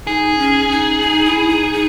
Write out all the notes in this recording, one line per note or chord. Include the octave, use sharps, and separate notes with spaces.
D#4 G#4
C#4
D#4
D#4
E4
D#4
D#4